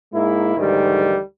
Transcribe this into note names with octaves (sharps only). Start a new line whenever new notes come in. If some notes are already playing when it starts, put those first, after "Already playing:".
G#2 G#3 A#3 E4
D2 G#2 D#3 E3 G3